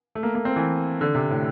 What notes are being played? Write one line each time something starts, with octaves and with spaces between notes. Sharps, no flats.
A3
A#3
A#3
C4
E3
D3
C3
A2